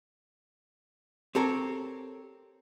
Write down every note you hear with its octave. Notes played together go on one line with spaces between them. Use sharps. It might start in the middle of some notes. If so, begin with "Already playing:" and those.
C4 G4 A4 A#4 C#5